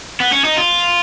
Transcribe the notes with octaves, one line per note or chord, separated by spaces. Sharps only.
B3
C#4
D#4
F4